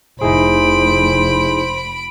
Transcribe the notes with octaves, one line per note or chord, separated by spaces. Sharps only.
F1 D#4 E4 G#4 C5 B5 D7